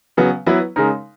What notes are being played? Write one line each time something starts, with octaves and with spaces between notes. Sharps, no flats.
C#3 F#3 B3
F#3 B3 E4 B4
C#3 G#3 D#4 A#4